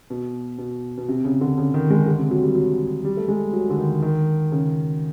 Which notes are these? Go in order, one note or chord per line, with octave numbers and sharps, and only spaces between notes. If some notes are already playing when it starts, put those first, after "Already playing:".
B2
B2
B2
C3
C#3
D3
C#3
D#3
G#3
D3
C3
F#3
G3
F#3
G3
A3
G#3
F#3
D3
D#3
D#3
C#3